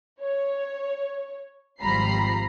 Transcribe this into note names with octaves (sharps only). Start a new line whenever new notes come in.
C#5
G#1 F3 G3 A#5 B5 C7